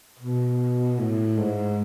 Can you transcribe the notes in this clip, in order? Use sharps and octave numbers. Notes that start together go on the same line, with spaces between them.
B2
A2
G#2